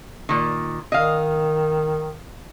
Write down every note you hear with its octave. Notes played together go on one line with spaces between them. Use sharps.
A#2 D#3
D#3 D#5 F5